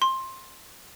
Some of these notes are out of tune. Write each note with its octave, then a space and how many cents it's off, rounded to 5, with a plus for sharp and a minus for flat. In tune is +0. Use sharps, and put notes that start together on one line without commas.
C6 +15